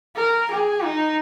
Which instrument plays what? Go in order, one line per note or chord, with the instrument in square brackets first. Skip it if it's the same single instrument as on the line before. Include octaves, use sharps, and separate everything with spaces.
[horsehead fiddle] A#4
G#4
D#4